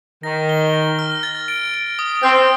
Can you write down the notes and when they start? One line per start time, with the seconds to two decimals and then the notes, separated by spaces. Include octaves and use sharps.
0.23 D#3 A#6
0.49 G7
0.74 A#6
0.99 F6
1.23 A6
1.48 D7
1.74 D7
1.99 D#6
2.23 C4 F6